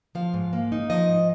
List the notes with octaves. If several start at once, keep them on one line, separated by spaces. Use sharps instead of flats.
F3 F5
G#2
A#3
D#4
F3 D#5
G#2